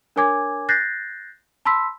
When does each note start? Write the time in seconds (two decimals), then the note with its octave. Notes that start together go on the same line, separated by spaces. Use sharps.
0.16 D4 A#4 C#5 G#5 D6 G#6
0.69 F#6 G6 A6 A#6 C7
1.65 A5 B5 C6 E6 B6